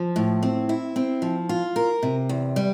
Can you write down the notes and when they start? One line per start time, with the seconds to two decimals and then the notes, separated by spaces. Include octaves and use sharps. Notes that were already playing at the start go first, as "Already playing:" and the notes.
Already playing: F3
0.16 A2
0.43 C4
0.69 E4
0.96 C4
1.22 F3
1.49 F4
1.76 A#4
2.03 C3
2.29 E2
2.56 G3